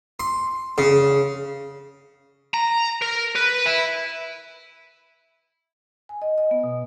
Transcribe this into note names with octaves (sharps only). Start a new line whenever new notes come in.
C6
C#3
A#5
A#4
B4
E4
G#5
D#5
D#5
B3
B2